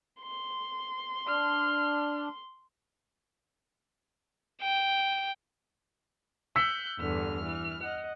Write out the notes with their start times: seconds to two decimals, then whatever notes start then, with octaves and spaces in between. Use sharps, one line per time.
0.22 C6
1.27 D4 F6
4.62 G5
6.56 E6 F#6 G6 B6 C#7
7.00 E2 G2 D3 F6
7.45 E3
7.82 D#5 F#5